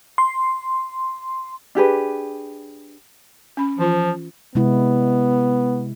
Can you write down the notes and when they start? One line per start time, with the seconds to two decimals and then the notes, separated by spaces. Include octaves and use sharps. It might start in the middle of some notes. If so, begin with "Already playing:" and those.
0.18 C6
1.75 D4 G4 G#4 B4
3.57 C#4 B5
3.79 E3 F3 F4
4.55 C3 G#3 B3 E4